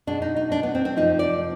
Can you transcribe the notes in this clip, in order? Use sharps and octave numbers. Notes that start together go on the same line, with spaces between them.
B2 G#3 D4
D#4
D#4
D4
B3
C4
C4
F2 C3 F3 D#4
D5